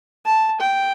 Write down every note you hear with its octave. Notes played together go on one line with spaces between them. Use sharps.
A5
G5